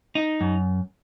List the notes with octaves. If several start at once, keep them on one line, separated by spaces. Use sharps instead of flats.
D#4
F#2